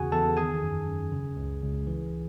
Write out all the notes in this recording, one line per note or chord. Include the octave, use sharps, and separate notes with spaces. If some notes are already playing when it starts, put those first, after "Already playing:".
Already playing: E2 C#3 F#4 G#4 F#5 G#5
E2 A4 A5
D#3 G#4 G#5
F#2
F#2
C#3
C#2
C#2
E3